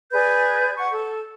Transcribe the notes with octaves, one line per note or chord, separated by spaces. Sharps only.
G#4 B4 D5 G6
F#5 C#6
A4